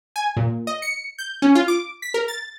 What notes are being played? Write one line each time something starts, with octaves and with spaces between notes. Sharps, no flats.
G#5
A#2
D#5
C#7
G6
C#4
F4
D6
B6
A#4
A6